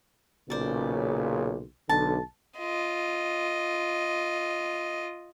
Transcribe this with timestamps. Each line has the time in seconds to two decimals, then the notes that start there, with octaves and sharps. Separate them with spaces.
0.50 B1 A#2 C#3 C5 D5
1.89 B1 D3 A5
2.58 F4 D#5